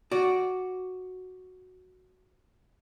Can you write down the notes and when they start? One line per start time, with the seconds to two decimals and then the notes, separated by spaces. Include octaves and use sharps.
0.11 F#4 D5